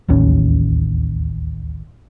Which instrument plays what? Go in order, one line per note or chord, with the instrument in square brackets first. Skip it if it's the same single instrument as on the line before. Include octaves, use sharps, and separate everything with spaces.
[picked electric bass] D1 A1 D#2 C#4